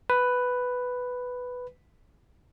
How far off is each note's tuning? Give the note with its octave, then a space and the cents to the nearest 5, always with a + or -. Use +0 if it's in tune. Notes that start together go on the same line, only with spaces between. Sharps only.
B4 +5